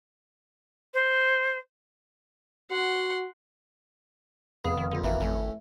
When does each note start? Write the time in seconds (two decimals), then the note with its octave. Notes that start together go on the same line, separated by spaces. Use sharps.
0.94 C5
2.71 F#4 F#5 C6
4.65 F1 B3 G#4 F5 D#6
4.77 D#3
4.92 A#1 F2 D3
5.04 G#1 E3 A#3 F#4 E5
5.20 G#1 A2 A3 C#4